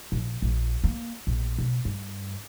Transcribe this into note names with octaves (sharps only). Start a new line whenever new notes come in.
A#1
A#1
A#3
A#1
B2
G2